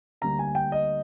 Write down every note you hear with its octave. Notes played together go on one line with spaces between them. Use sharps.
D2 D3 G3 A#3 A#5
G#5
G5
D#5